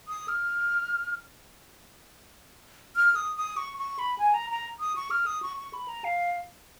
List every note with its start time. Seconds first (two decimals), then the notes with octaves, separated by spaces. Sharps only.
0.08 D#6
0.28 F6
2.96 F6
3.15 D#6
3.36 D#6
3.57 C#6
3.78 C#6
3.99 B5
4.18 G#5
4.34 A#5
4.50 A#5
4.80 D#6
4.96 C#6
5.11 F6
5.26 D#6
5.43 C#6
5.57 C#6
5.74 B5
5.88 A#5
6.04 F5